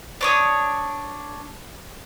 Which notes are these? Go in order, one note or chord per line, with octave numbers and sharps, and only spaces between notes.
D4 C#5 D#6